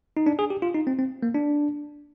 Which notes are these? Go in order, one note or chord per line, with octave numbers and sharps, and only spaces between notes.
D#4
D4
G#4
G4
F4
D#4
C4
C4
A#3
D4